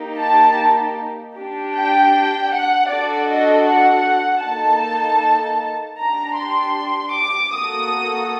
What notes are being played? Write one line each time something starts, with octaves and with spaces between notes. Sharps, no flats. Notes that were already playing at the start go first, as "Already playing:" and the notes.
Already playing: A#3 D#4 G4
A5
D4 G4
G5
F#5
D4 F#4 A4 D5
D#5
F#5
A#3 D#4 A4 A5
D4 G4 A#5
C6
D6
A#3 F#4 A4 D#6